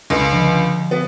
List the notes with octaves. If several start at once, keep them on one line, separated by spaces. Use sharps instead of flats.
C#2
D3 F3
G6 B6
B3